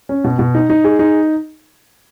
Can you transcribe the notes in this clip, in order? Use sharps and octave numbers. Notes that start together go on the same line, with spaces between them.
C#4
B2
B2
D#4
D#4
G#4
D#4